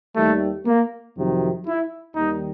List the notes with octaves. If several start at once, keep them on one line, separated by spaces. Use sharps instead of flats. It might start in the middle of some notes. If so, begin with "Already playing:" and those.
D#2 D#3 G3 A3
A#3
F2 C3 D#3 F#3
E4
D#2 D#3 G3 D#4